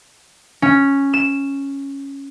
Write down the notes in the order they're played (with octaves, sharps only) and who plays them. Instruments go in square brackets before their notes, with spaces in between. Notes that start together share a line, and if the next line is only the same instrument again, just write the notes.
[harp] C#4
E7